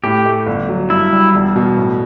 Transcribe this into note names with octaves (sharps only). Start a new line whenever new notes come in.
A2 G4
A3
G1
F#3
G2 E4
G3
E1
B2
A2